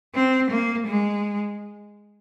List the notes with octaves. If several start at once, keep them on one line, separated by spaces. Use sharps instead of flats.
C4
A#3
G#3